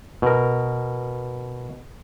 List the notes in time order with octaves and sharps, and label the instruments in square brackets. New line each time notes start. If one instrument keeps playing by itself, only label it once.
[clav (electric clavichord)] B2 A#4